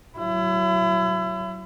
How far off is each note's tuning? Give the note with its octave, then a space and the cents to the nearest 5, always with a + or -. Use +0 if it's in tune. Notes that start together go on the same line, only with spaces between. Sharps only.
F#3 +15 E4 +30